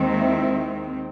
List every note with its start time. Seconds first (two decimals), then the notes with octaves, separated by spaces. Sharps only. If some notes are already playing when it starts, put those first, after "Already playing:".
Already playing: D#2 D#3 G#3 C4
0.16 E4